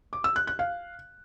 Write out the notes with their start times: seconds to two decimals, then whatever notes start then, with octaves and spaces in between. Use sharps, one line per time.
0.13 D6
0.24 E6
0.36 F#6
0.47 F#6
0.59 F5